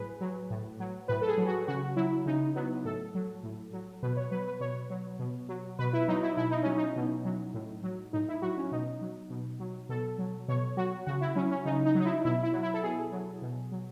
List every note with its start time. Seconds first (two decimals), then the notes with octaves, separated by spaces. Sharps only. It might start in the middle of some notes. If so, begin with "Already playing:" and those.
Already playing: A2 F#3 G#4 B4
0.21 F#3
0.50 A2
0.80 F#3
1.08 A2 B4
1.22 A4
1.28 G#4
1.38 F#3
1.47 F#4
1.68 C#3 F#4
1.96 F#3 E4
2.26 C#3 D#4
2.56 F#3 B3
2.85 A2 A4
3.15 F#3
3.43 A2
3.73 F#3
4.03 B2 B4
4.17 C#5
4.31 F#3 B4
4.47 B4
4.60 B2 C#5
4.90 F#3
5.19 B2
5.49 F#3
5.79 B2 B4
5.93 E4
6.08 F#3 D#4
6.23 E4
6.37 B2 E4
6.51 D#4
6.63 F#3 C#4
6.77 D#4
6.96 B2
7.25 F#3
7.54 A2
7.83 F#3
8.13 A2 D#4
8.29 E4
8.42 F#3 F#4
8.57 C#4
8.72 B2 D#4
9.01 F#3
9.30 B2
9.59 F#3
9.89 B2 A4
10.18 F#3
10.48 B2 C#5
10.77 F#3 F#4
11.06 C#3 F#4
11.21 E4
11.36 F#3 C#4
11.51 C#4
11.65 C#3 D#4
11.85 D#4
11.95 F#3
12.00 D#4
12.05 E4
12.25 B2 E4
12.43 E4
12.53 F#3
12.63 E4
12.74 A4
12.83 B2 G#4
13.12 F#3
13.42 B2
13.72 F#3